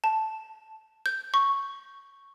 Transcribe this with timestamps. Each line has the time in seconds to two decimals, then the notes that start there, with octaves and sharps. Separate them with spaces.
0.04 A5
1.06 G6
1.34 C#6